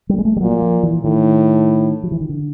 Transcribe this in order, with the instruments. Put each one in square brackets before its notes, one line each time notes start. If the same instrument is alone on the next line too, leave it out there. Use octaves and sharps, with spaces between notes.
[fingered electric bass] G3
G#3
A3
G3
[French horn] A#2 [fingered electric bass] F#3
[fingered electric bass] F3
E3
[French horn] A2 [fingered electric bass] D#3
[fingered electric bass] F3
E3
D#3
D3